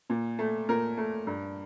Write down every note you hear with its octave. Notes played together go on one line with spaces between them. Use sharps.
A#2
A3
A#2 A#4
A3
G2